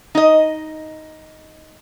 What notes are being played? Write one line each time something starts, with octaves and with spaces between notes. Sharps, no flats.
D#4 D#5